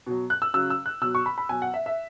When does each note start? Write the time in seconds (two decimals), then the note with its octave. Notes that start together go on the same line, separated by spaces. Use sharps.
0.07 B2 F#3
0.30 F#6
0.42 E6
0.54 C#3 F#3 E6
0.70 E6
0.86 F#6
1.01 B2 F#3 E6
1.15 C#6
1.26 B5
1.38 B5
1.49 B2 F#3 G#5
1.62 F#5
1.74 E5
1.86 E5